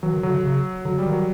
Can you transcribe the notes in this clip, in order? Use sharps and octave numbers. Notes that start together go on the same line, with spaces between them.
E3 F#3
D#3
D3 F#3
D3
C#3
D3 F#3
G3
D#3
F#3